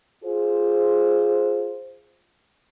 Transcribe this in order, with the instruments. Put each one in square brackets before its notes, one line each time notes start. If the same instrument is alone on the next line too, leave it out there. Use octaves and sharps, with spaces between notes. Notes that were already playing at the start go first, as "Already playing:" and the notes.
[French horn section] F4 G#4 C5